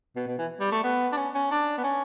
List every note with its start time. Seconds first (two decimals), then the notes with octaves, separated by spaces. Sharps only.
0.16 B2
0.27 B2
0.39 E3
0.61 G3
0.72 A3
0.84 B3
1.12 D4
1.17 C#4
1.35 C#4
1.51 D4
1.78 B3
1.84 C#4